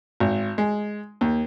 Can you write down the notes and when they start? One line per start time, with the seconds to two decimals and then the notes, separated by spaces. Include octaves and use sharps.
0.20 G#1
0.58 G#3
1.21 D#2